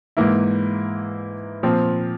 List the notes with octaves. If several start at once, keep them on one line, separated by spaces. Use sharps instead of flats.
G#2 E3 A#3 E4
A#2 F3 C4